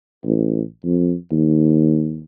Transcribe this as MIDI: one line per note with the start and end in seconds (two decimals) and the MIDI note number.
0.25 0.61 33
0.84 1.14 41
1.32 2.24 39